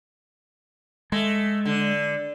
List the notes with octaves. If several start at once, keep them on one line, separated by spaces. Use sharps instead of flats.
G#3 A3
D3